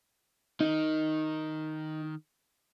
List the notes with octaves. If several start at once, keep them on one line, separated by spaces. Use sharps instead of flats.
D#3 D#4